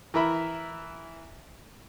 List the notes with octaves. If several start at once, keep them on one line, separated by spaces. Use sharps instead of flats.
E3 A#4 E5 B5